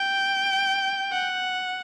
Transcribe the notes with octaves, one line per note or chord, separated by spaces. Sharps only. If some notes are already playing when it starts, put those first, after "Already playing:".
Already playing: G5
F#5